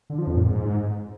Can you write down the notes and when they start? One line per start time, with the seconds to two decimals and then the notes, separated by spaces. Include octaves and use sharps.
0.10 D3
0.18 F3
0.27 F2
0.36 A#2
0.44 G#2